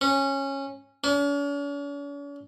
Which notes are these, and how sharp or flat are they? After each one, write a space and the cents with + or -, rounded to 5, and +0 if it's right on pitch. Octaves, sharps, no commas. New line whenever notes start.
C#4 -15
C#4 +45